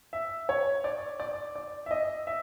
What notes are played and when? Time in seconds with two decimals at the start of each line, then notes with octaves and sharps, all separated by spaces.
0.13 E5
0.49 C#5
0.84 D5
1.20 D5
1.56 D5
1.86 E5
1.91 D#5
2.27 E5